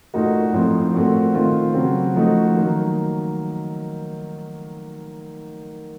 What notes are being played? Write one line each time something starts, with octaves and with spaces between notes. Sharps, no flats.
A#2 A3 D#4 F#4
A2 F3 C4 D#4
A#2 A3 C4 F#4
D#3 A3 C4 F4
C#3 F#3 C4 F#4
F3 A3 D#4 F#4
D#3 F#3 A#3